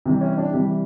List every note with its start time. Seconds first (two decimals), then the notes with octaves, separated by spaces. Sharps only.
0.06 C3 E3 G3
0.21 C#4
0.38 D4
0.53 C3 E3 G3 G4